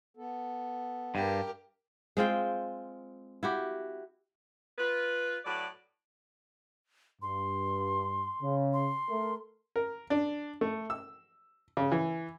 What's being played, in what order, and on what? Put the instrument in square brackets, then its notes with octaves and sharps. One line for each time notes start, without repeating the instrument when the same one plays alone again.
[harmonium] B3 A4
[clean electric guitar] G2 [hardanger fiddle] G4 A#4
[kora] G#3 C4 F4 G5
E4 F#4 G4
[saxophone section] F4 B4
A2 F#3 B4 D5
[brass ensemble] G2 [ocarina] C6
[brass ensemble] C#3
[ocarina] C6
[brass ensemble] A3 A#4
[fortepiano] A#4
D4
A3
E6
C#3
E3